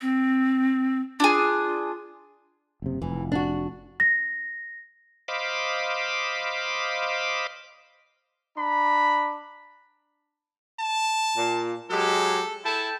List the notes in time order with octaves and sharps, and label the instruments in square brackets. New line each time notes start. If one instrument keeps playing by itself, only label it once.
[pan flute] C4
[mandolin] D4 G#4 [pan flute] F4
[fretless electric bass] F#1 C3
[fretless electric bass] F1 [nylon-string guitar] E3
[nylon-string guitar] D4 F#4
[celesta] A#6
[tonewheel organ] C5 D#5 F5 B5 D6
[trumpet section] D4 A#5 B5
[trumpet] A5
[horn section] A#2
[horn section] F#3 G#3 G4 [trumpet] A4
[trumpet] E4 [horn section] A4 G5 A5